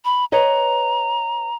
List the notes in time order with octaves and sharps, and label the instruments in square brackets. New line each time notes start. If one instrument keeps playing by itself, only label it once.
[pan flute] B5
[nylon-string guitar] B4 C#5 D#5 [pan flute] A#5